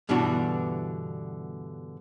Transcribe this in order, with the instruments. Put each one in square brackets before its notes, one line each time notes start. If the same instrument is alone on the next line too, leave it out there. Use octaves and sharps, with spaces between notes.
[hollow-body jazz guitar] G2 B2 D3 E3 D4 F#4